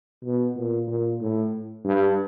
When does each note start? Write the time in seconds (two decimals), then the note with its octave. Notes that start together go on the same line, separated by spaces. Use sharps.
0.24 B2
0.56 A#2
0.88 A#2
1.21 A2
1.85 G2